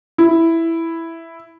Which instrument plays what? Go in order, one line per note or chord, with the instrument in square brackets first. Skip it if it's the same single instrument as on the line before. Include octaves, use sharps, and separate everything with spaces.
[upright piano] E4